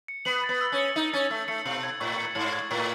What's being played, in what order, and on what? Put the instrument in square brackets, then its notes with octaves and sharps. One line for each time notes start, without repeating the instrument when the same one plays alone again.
[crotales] C#7
[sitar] B3 [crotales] F#7
[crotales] A6
[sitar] B3
[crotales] E6
[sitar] C#4
[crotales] C#7
[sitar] D#4 [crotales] F#7
[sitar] C#4 [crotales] A6
[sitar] A3 [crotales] E6
[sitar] A3 [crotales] C#7
[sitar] B2 [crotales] F#7
[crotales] G#6
[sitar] A2 [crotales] C#6
[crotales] C#7
[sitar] G#2 [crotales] F#7
[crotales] G#6
[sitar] A2 [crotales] C#6